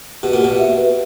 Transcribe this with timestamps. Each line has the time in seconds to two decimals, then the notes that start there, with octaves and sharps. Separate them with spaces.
0.23 B2 G4
0.33 A#2
0.42 B2 G4
0.59 E5
0.78 B4